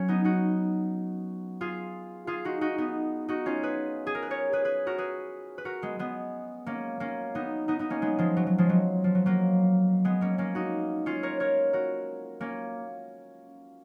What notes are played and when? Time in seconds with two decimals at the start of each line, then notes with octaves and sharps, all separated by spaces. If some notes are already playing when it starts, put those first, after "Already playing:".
Already playing: F#3 C#4
0.08 B3 D#4
0.24 D#4 F#4
1.61 F4 G#4
2.27 F4 G#4
2.45 D#4 F#4
2.61 D#4 F#4
2.78 B3 D#4
3.28 D#4 F#4
3.46 C#4 F4
3.63 G#4 B4
4.07 G#4
4.15 A#4
4.22 B4
4.30 A#4 C#5
4.53 G#4 B4
4.64 G#4 B4
4.87 F#4 A#4
4.98 G#4 B4
5.58 B4
5.65 F#4 A#4
5.82 G#3 B3
5.99 G#3 B3
6.66 A#3 C#4
7.00 A#3 C#4
7.35 B3 D#4
7.68 B3 D#4
7.79 B3 D#4
7.90 A#3 C#4
8.02 G#3 B3
8.19 F3 G#3
8.37 F#3
8.47 F#3
8.58 F3 G#3
8.70 F#3
9.04 F3
9.15 F#3
9.26 F#3 A#3
10.05 G#3 B3
10.21 A#3 C#4
10.38 A#3 C#4
10.55 D#4 F#4
11.06 C#4 F4
11.23 A#4 C#5
11.40 A#4 C#5
11.73 F#4 A#4
12.41 A#3 C#4